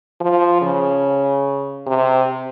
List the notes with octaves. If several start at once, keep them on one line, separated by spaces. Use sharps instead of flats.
F3
C#3
C3